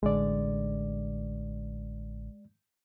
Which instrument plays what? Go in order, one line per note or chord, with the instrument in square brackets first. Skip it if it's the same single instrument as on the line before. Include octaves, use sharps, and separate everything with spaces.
[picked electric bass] A1 D3 [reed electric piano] G#3 D5